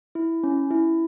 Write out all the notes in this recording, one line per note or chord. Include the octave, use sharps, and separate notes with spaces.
E4
C#4
E4